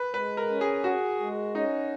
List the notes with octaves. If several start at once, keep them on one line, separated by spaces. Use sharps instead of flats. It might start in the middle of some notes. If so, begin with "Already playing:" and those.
Already playing: B4
G#3 B4
A#4
C#4
G#4
F#4 G#4
G#3
C#4 D#4